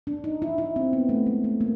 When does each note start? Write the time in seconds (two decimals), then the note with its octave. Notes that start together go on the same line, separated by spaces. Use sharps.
0.07 D4
0.24 D#4
0.42 E4
0.58 E4
0.76 C4
0.93 B3
1.09 A3
1.27 G#3
1.44 A3
1.61 A#3